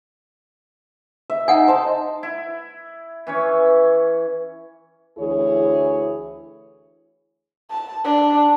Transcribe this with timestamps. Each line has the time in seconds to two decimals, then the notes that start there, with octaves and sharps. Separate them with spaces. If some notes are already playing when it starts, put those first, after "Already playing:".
1.30 E5
1.48 D#4 D#5 F#5 G#5
1.68 C5 A5
2.23 E4
3.27 E3 C#4 C#5
5.18 D2 E3 E4 G#4 C#5
7.70 A5
8.04 D4